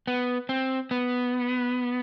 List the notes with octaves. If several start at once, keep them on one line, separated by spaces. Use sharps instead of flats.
B3
C4
B3